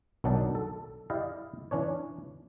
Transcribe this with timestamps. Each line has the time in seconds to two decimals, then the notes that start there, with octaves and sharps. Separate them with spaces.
0.24 B1 D#3 F#3 D4 D#4 A5
0.55 A4
1.10 E4 G4 D5 D#5 F5
1.71 E3 C#4 D4 C#5